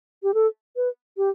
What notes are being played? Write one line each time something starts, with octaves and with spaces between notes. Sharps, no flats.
G4
A4
B4
G4